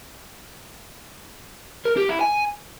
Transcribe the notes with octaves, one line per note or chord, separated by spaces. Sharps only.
A#4
G4
E4
G#5